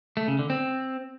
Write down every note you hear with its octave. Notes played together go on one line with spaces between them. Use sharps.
A3
C#3
D3
C4